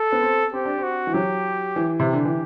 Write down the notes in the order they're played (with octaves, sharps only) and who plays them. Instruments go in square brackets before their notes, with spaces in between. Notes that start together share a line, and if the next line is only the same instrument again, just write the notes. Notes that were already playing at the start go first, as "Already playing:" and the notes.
Already playing: [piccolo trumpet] A4
[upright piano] B3
C4
[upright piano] C4 [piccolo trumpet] G4
[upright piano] D4
C4
[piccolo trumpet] F#4
[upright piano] E3
[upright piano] F#3 [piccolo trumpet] G4
[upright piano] E3
C3
[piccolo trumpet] G4
[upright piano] D3
E3